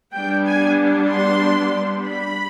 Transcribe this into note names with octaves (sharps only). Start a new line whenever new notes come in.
G3 B3 D4 G5
G#5
C6
B5